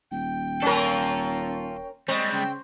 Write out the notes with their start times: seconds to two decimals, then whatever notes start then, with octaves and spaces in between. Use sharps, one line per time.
0.11 D#1 G5
0.62 C#4 F4 A4 A#4
2.08 G3 G#3 C4 D#5
2.33 C#3 G5